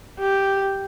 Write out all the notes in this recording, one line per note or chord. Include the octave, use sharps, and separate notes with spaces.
G4